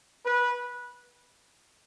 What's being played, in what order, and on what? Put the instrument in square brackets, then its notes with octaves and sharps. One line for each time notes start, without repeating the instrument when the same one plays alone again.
[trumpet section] B4